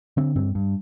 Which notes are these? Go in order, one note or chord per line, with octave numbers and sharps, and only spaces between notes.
D3 C4
G2 C4
G2